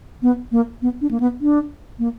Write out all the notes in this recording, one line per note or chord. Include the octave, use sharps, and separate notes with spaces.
B3
A#3
B3
D4
A#3
B3
D4
A#3